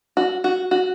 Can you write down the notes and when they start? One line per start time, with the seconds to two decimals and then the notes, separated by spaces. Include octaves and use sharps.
0.17 F#4
0.44 F#4
0.71 F#4